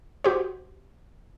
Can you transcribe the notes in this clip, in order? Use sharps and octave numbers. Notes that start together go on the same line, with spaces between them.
F#4 G4 C5